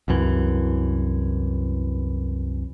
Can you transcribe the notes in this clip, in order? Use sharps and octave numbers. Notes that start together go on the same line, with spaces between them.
C2 F#2 E3